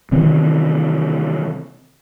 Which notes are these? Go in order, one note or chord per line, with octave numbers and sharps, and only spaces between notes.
C3 D#3 E3 C4